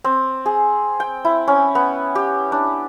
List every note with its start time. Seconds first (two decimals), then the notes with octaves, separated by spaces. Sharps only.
0.04 C4
0.46 G#4
1.00 G5
1.25 E4
1.48 C#4
1.75 B3
2.15 G4
2.52 D4